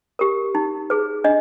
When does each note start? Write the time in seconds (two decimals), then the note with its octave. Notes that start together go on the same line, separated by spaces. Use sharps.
0.19 G4 A#4
0.55 D#4
0.90 G#4 B4
1.24 D4 D#5